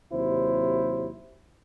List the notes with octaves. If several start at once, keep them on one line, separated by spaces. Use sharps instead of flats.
D#2 C3 F#3 E4 C5